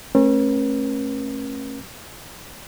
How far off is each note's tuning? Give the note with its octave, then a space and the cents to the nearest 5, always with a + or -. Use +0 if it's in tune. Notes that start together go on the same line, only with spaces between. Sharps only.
A3 +0 C#4 -40 A#4 +45